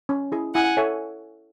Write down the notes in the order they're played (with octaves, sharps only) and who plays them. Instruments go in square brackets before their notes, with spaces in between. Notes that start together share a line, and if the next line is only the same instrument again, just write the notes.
[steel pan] C#4
E4 G#4
[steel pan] E4 [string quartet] F#5 G#5
[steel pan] A4 C#5 E5 G#5